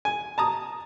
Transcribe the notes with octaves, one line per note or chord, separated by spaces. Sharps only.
G#5
A5 A#5 D#6